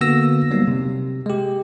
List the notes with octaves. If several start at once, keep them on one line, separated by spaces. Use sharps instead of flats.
D3 A#3 B3 F#4 E6 A#6
F#3 G3 A#3 B3 D#4
C3
G#3 G4